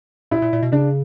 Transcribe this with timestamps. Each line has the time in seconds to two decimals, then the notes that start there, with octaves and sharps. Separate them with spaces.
0.31 A#2 E4
0.42 A#2
0.53 A#2
0.63 B2
0.72 C#3 D4